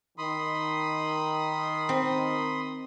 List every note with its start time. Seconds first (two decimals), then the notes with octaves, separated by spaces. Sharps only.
0.18 D#3 B5 C6 D#6
1.89 C4